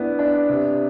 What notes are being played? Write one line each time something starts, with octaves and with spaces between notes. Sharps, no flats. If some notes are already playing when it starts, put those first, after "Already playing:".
Already playing: B3 D4 E4
D4
C3